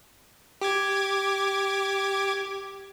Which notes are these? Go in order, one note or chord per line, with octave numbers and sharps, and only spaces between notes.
G4 D6 G#6